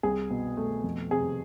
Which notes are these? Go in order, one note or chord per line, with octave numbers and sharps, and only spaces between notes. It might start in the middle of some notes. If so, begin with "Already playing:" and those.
C2 G#4
B2
A3
F2
C3 G#4